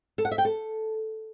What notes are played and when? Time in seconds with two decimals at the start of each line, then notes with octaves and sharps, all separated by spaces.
0.18 A4
0.25 F#5
0.31 E5
0.38 G5
0.45 A4